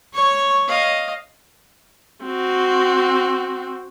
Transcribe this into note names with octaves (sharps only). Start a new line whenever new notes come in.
C#5 C#6
D#5 F5
C4 F#4